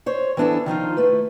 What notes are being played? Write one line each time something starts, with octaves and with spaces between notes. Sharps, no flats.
C5 C#5
E3 B3 D4 E4 A4
D#3 F3 D#4 F4
A3 E4 B4